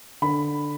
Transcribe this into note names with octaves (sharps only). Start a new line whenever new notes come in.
D3 B5